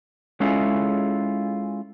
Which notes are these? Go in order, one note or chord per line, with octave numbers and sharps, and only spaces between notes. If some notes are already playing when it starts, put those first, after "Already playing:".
G#3 C#4 E4 F4 G#4 A4